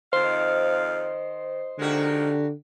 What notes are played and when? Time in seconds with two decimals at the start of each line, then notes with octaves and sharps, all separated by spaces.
0.13 F2 D#3 C5 F5
1.79 D3 D#3 F3 G#3 A#3 F#4 G4